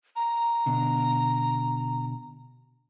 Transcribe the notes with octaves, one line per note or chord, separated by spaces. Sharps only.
A#5
B2 D3